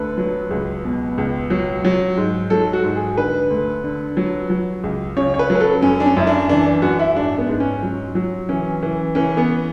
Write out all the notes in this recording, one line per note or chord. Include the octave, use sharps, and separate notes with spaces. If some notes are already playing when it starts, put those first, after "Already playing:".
Already playing: D2 D3 B4
F#3
C#2
B2
C#2
F#3
F#3
G#2
F#3 A4
F#4
G#2
G#4
D3 B4
D2
D3
F#3
F#3
C#2
C#3 C#5
C#5
B4
F#3
B4
A4
F#2 C#4
D4
C#4
F#2 E4
D4
E3 D4
D4
F#2 F#4
E4
G#2 D4
B3
G#2
C#4
F#3
F#3
E3 C#4
E3
E3 C#4
B3